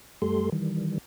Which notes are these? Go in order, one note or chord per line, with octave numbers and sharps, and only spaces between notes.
F#2 G3 A3 G4 A4 C6
D#3 E3 G3